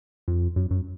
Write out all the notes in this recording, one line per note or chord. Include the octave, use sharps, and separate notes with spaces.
F2
F#2
F#2